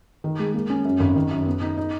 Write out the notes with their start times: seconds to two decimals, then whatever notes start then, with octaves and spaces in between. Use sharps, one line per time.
0.24 D#3
0.39 G#3
0.54 A#3
0.70 C#4
0.85 F#2
1.00 G#1
1.16 D#3
1.31 F#2
1.47 B3
1.62 D#4
1.77 D#4